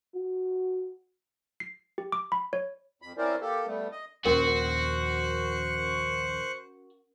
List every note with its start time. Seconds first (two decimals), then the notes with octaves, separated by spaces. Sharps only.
0.15 F#4
1.60 C7
1.98 G4
2.12 D6
2.32 B5
2.53 C#5
3.02 F2 B5
3.18 C4 C#4 E4 A#4 C5 D5
3.41 A#3 G4 A4
3.66 G3 A3 B3
3.92 D#5
4.25 A#1 D#2 C#4 F#4 A#4 C5 C#6 F#6